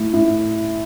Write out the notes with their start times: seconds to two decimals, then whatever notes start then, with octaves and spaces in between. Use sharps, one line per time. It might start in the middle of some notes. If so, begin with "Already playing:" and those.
Already playing: A2
0.13 A2